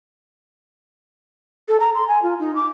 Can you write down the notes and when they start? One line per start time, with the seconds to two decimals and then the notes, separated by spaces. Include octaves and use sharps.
1.68 A4
1.80 A#5
1.95 C6
2.08 G#5
2.23 F4
2.40 D#4
2.55 D6